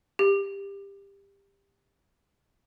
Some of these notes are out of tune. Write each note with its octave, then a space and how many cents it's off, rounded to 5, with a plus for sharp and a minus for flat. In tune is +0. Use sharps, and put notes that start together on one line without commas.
G4 +20